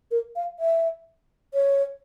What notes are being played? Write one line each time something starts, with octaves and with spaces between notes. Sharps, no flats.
A#4
F5
E5
C#5